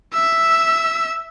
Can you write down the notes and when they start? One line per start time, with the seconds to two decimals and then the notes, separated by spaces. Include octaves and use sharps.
0.13 E5 E6